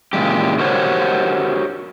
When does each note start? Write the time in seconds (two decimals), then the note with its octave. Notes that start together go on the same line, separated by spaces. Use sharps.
0.13 A#2 C#3 E3 G#3 G4
0.59 F#4 G4 A#4 C5 C#5 F#5